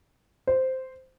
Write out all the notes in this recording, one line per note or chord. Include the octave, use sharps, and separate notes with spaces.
C5